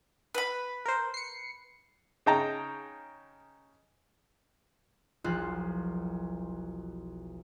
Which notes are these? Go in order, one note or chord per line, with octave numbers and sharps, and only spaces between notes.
B4 B5
A#4 C5
C7 C#7
C#3 D#4 G5 A5 A#5
E1 B1 F3 F4 C5 F#6